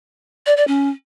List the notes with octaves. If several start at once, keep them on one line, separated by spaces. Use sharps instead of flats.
D5
D5
C#4